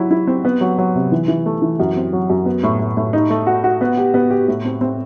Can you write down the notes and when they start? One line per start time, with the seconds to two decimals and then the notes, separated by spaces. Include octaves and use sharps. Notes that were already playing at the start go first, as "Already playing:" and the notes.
Already playing: F#3 E4
0.11 E4
0.27 C4
0.45 B3
0.61 F#3
0.78 F#3
0.95 C3
1.12 E3
1.28 E3
1.46 A3
1.62 E3
1.80 F#2
1.96 C4
2.13 F#3
2.30 F#2
2.46 B3
2.63 A2
2.80 A2
2.97 A2
3.13 D#4
3.30 A3
3.47 F#4
3.64 F#4
3.81 B3
3.98 G4
4.14 B3
4.31 G4
4.48 A2
4.65 C4
4.81 C4